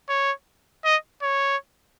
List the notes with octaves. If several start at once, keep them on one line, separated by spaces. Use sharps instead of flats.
C#5
D#5
C#5